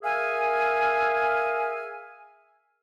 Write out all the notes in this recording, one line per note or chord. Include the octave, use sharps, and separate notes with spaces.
G#4 A#4 E5 F5 G#5